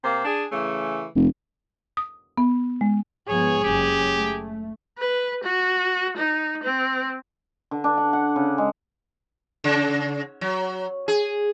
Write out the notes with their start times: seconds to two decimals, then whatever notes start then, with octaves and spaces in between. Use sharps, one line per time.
0.04 C3 A#3 C5
0.25 D4 G#4
0.51 C#3 E3 A3
1.16 F1
1.97 D#6
2.38 B3
2.81 G#3
3.28 G#2 F3 B3 G#4 C#5
3.64 F#1 G#3 C#4 G4
4.18 A3
4.98 B4
5.44 F#4
6.17 D#4
6.63 C4
7.71 D3
7.84 D4
7.97 F#5
8.13 F#5
8.36 C#3
8.58 G#3
9.64 C#3
10.41 F#3
11.08 G#4